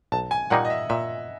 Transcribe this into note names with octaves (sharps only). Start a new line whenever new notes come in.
B1 A5
G#5
A#2 G3 A#3 D#4 F#5
D#5
E5
A#2 E5